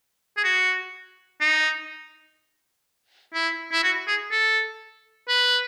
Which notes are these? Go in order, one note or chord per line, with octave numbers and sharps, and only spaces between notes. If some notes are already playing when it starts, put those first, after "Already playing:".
G#4
F#4
D#4
E4
E4
F#4
G#4
A4
B4